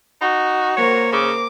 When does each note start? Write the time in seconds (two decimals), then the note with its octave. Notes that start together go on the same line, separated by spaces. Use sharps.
0.21 D#4 F#4
0.77 A#3 A#4 C5 C#5
1.12 C#3 D6